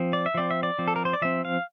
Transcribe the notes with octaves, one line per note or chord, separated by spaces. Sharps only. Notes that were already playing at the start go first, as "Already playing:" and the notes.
Already playing: F3 C4
D5
E5
F3 C4 D5
E5
D5
F3 C4
A4
A#4
C5
D5
F3 C4 E5
F5